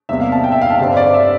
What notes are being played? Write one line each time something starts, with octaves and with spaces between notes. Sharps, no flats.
E2 C3 G3 A#3 E5
F5
A5
G5
E5
F5
A5
G2 D3 G3 C4 F5
D5
E5